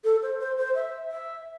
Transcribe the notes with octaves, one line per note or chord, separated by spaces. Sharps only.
A4
C5
C5
C5
E5
E5